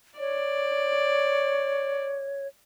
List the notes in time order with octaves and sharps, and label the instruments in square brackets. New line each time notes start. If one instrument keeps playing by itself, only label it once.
[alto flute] C#5 [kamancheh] D5